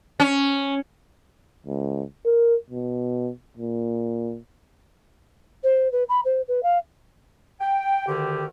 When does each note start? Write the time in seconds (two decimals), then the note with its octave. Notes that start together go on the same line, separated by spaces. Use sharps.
0.20 C#4
1.67 C#2
2.26 A#4
2.70 B2
3.57 A#2
5.63 C5
5.92 B4
6.09 B5
6.24 C5
6.47 B4
6.63 F5
7.60 G5
8.08 D2 D3 D#3 G4